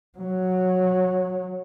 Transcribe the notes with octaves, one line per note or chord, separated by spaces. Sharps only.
F#3